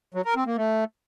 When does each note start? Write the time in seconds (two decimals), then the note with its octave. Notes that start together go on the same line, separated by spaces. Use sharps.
0.14 F#3
0.25 A#4
0.36 C4
0.46 A#3
0.57 A3